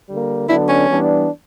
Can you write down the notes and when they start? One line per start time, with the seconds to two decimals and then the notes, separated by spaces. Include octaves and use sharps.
0.08 D3 G3 A#3
0.48 D3 F#3 B3 D4 E4
0.68 C#4
0.88 E3 G3 B3 D4